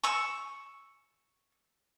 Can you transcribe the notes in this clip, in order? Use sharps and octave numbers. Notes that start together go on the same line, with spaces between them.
C#6 E6